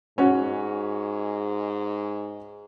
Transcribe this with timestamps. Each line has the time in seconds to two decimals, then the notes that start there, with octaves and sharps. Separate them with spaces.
0.18 G#2 C#4 F#4